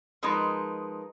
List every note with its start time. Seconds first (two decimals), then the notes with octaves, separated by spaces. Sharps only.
0.23 F3 G#3 D#4 A#4 B4